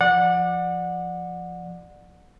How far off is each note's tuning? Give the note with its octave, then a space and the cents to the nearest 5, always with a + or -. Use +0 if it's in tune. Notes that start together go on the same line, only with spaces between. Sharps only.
F3 +0 D5 +20 F#5 -20